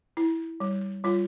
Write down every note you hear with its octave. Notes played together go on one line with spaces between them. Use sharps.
E4
G3
G3 F4